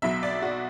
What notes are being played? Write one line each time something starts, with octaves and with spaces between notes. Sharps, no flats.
B1 B2 F#3 E5
D5
F#4